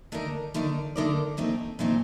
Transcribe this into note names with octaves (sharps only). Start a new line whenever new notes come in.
D3 A3 D#4 A#4 D5
D3 A3 D#4 A#4 D5
D3 A3 D#4 A#4 D5
A#2 A3 C4 D#4
A#2 A3 C4 D#4